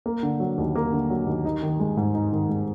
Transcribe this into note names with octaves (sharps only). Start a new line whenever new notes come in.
A#3
D3
F#3
D#2
A#3
D3
F#3
D#2
D#4
D#3
G#3
G#2
D#4
D#3
G#3